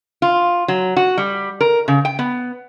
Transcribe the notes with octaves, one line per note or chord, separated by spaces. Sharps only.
F4
F#3
F#4
G3
A#4
C#3
G5
B3